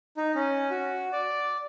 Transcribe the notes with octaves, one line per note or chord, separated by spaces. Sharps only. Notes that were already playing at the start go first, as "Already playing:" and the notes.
D#4
C#4
F#4
D5